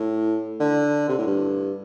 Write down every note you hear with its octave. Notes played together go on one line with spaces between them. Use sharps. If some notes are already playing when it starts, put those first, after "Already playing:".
Already playing: A2
D3
C3
A2
G2